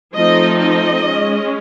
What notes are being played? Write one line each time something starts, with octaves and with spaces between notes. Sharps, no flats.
F3 A3 C4 D#4 D#5
D#5
G#3 C#4